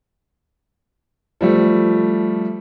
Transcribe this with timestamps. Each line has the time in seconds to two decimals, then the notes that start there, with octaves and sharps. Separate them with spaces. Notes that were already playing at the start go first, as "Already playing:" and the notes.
1.41 F3 G3 A3